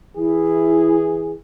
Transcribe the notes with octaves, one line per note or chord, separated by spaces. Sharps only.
E3 E4 G#4